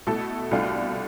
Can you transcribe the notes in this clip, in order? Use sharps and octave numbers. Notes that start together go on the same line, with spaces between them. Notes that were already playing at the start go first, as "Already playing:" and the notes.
B2 A3 E4 A4
C2 B2 A3 D4 F4